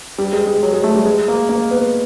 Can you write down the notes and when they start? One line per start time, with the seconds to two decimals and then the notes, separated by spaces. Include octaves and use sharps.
0.18 G3
0.33 G#3
0.47 G#3
0.63 F#3
0.74 G#3
0.84 A3
0.95 G3
1.06 G#3
1.28 A#3
1.49 A#3
1.71 B3